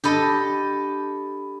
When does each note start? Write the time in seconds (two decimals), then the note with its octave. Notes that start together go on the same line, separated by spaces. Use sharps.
0.04 D4 G4 A4 D#5 B5